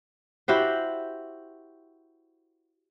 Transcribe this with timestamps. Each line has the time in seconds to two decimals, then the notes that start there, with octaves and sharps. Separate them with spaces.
0.48 E4 F#4 G4 C5